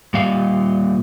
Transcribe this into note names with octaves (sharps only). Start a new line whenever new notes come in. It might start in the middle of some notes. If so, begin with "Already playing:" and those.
A#2 G3 D#5 F5